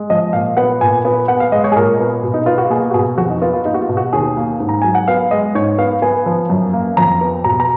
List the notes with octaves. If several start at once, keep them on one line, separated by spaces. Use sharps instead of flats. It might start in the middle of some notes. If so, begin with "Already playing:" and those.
Already playing: G#3
F3 D#5
A#2 F5
B3 F#5
A#2 G#5
B3
B3 F#5
F5
G#3 D#5
C#5
G#4
A#2 A#4
B3
B2
D#4
B3 F4
F#4
A#3 G#4
F#4
B2 G#4
F2 F#4
D#4
B3 F4
F4
A#3 D#4
F#4
F4
B2
F#4
D#2 G#4
A#3
G#2
A#5
F#3 G#5
F#5
B3 F5
G#3 D#5
G#2 C#5
B3 F5
B3 G#5
F3
F#2
A#3
F2 A#5
B3
B2 A#5
A#5